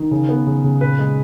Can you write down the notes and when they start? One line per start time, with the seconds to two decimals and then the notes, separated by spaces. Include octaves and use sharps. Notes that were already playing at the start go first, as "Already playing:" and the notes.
Already playing: D#3
0.11 C#3
0.29 B3
0.47 C#3
0.64 C#3
0.81 A#2 B4
0.99 G#3